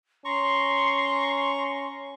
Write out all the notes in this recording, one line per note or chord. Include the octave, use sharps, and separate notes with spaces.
C#4 A#5 C6 C#6